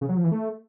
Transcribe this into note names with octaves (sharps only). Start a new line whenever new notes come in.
C#3
F#3
F3
E3
A3